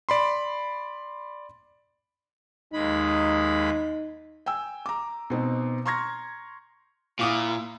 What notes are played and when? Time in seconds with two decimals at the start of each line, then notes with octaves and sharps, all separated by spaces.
0.09 D5 B5 C6
2.73 D#2 G#3 D#4 B5
4.46 G5 G#5 E6
4.86 A#5 D6
5.30 B2 C4 D#4
5.86 A#5 C6 C#6 F6 G#6 A#6
7.19 A#2 E4 F4 D6 D#6